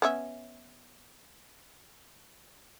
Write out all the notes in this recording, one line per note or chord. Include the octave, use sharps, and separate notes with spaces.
B3 C#4 E5